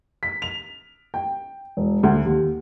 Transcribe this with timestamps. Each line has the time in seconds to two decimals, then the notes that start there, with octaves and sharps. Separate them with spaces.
0.23 B6
0.42 F7
1.14 G5
1.77 E1
2.03 D2
2.26 D#2